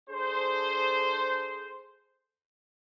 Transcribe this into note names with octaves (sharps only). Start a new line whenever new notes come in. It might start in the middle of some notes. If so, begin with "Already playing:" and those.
D4 G#4 A4 C5